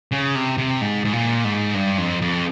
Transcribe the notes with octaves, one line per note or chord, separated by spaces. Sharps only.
C#3
C3
C3
G#2
G#2
A#2
G#2
G2
F2
F2